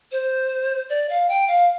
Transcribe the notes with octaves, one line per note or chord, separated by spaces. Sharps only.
C5
D5
F5
G5
F5